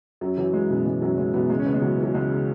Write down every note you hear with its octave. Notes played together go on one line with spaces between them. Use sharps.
F#2 F#3
E3 F#3
E3 G#3
F#2 B2 B3
E3 G#3
F#2 F#3
E3 G#3
B2 E3 B3
C#2 G#3
C#4
C#3 B3
G#3
E3 F#3
E3
F#3
C#2 G#3
C#3